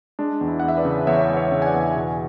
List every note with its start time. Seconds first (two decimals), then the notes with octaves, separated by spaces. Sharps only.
0.19 G#3 D4
0.41 E2
0.48 E4
0.60 E2 F#5
0.68 E5
0.77 B4 D5
0.85 C#3
1.07 E2 C#5 E5
1.29 G#3
1.37 C#5 E5
1.51 C#3
1.62 G#5
1.66 D5 F#5
1.74 E2
1.96 B2